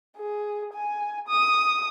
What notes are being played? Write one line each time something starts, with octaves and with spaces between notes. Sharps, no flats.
G#4
G#5
D#6